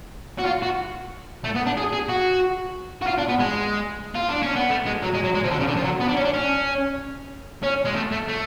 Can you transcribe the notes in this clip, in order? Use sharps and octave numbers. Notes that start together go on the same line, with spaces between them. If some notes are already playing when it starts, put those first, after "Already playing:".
F#4
F4
F#4
A3
B3
D4
G#4
G#4
F#4
F#4
F4
D4
B3
G#3
F4
D4
C#4
B3
A3
G#3
F#3
G#3
F#3
G#3
F3
D3
C#3
D3
F3
F#3
B3
D4
C#4
D4
C#4
C#4
G#3
A3
A3
A3